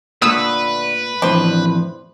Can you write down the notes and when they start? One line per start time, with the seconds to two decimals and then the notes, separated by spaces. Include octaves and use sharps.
0.22 A#2 D3 A3 B4 D#6 E6
1.22 F2 A2 E3 D4 C5